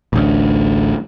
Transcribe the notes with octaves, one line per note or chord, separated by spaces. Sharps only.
A1 D2